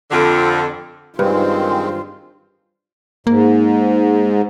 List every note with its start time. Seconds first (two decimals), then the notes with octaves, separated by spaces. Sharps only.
0.11 F2 D3
1.19 G2 D#3 G#3 C4 F4 C5
3.27 G#2 A#3